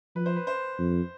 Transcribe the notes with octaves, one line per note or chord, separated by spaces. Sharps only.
F3 B4
C5
B4
C5
F2